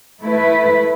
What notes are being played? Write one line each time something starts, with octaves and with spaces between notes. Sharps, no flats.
A3 E4 B4